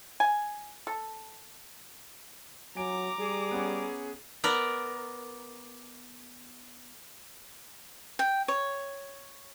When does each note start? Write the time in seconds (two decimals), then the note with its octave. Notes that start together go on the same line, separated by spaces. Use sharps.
0.20 G#5
0.87 A4
2.76 F#3 G#5 A#5 D6 D7
3.19 G3 G#4
3.51 B3 C#4
4.44 B3 A#4 D5
8.19 G5
8.48 C#5